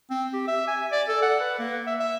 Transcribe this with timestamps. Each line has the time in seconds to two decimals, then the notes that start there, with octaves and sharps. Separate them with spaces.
0.10 C4
0.33 G4
0.47 E5
0.67 G#5
0.91 D5
1.08 A4
1.22 F#5
1.40 B4
1.59 A#3
1.86 E5
2.00 E5